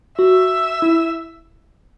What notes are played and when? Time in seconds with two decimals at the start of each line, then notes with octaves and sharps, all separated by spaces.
0.18 F#4 E5
0.82 E4